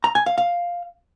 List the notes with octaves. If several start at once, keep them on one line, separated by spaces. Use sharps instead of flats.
A#5
G#5
F5
F5